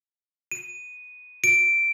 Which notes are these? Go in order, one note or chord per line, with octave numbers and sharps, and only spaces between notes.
D#7
D7